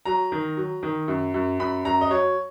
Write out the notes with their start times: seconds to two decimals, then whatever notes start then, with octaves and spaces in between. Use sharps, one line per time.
0.05 F#3 A#5
0.32 D#3
0.57 F#3
0.83 D#3
1.08 F#2
1.34 F#2
1.59 F#2 B5
1.85 F#2 A#5
2.01 D#5
2.10 F#3 C#5